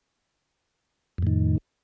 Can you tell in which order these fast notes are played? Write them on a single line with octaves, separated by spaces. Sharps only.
F2 A2 D#3